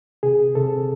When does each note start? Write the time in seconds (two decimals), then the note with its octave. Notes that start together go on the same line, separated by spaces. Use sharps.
0.23 C3 G#4
0.55 C3 A4